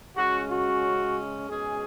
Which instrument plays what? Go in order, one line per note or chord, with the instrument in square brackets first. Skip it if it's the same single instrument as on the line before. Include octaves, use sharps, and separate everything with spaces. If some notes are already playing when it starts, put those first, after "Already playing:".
[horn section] C#3 G#3 C#4 F#4
F#4
B2 G#3 C#4 G#4